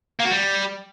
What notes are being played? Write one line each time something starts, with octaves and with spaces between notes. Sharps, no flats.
A#3
F#4
G3